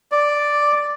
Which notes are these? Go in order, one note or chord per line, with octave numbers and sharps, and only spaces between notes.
D5